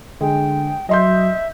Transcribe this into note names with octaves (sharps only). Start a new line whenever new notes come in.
D3 G#3 G5
F#3 D#5 E5 C6 G6